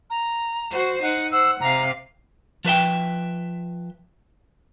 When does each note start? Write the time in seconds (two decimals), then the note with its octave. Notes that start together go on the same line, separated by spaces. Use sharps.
0.10 A#5
0.72 F#4 C5
1.02 D#4 F#5
1.32 C5 F#5 E6
1.61 C3 F5 A#5
2.65 F3 B4 E5 G5